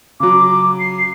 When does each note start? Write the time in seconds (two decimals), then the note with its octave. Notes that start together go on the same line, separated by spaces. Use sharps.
0.20 C#3 F#3 D6
0.80 C7